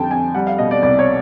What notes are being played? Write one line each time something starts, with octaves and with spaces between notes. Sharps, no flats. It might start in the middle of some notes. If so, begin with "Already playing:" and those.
Already playing: F2 D3 G3 G5 A5
F2 G#5
G3 F#5
F5
B2 D#5
D5
C2 D5
C#5